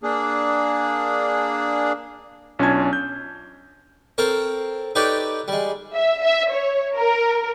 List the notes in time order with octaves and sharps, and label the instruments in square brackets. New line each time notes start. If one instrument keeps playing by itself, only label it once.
[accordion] A#3 D4 G#4
[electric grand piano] B1 C#4 D4 F4 A5 G#6
G6
[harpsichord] C4 A4 A#4 C#5
D#4 G4 A4 B4 C#5 D5
G3 G#3
[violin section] E5
E5
C#5
A#4